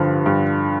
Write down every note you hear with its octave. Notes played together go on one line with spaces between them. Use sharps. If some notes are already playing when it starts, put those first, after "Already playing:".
Already playing: G2 D3 F3
G2